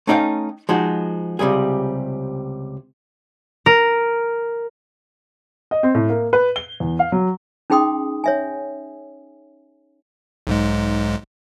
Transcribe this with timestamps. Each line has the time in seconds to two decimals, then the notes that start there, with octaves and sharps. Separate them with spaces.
0.07 A3 C#4 D#4 D5 F5 G5
0.69 F3 G#3 D#4 F#4
1.39 C#2 C3 D#3 G3 G#4
3.66 A#4
5.71 D#5
5.83 C4
5.94 A2
6.09 A#3
6.33 B4
6.56 G7
6.80 E2
6.99 F5
7.12 F#3
7.70 C#4 D#4 G#4 G5 C6 D#6
8.24 C#5 E5 G#5
10.47 B1 G#2 G#3